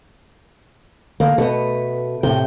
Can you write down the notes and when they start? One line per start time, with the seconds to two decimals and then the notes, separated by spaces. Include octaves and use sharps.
1.20 D3 A#3
1.38 B2 A3 B3
2.23 A2 C3 G5